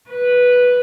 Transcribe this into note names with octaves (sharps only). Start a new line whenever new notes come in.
B4